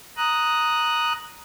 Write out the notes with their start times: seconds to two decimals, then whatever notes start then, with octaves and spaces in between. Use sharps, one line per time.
0.17 A#5 D#6 F#6